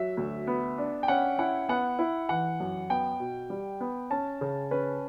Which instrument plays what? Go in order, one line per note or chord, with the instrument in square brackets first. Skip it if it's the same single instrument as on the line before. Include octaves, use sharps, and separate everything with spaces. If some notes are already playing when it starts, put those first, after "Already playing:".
Already playing: [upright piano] F#3 [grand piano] E5
[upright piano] D2
B3
D4
[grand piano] G5
[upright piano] C#4 [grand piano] F#5
[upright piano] E4 [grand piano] F#5
[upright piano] B3 [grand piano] F#5
[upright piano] E4
[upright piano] E3 [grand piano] F#5
[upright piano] F#2
[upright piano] B3 [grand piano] G5
[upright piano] B2
G3
B3
[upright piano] C#4 [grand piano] A5
[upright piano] C#3
[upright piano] C#4 [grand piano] B4